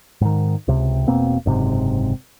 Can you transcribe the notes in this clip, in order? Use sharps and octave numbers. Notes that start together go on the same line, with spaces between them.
G#2 D#3
C#2 C3
E1 B2 A#3 C4
F#1 G#2 C3